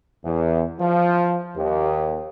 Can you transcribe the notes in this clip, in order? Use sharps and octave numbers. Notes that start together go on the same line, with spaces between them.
E2
F3
D#2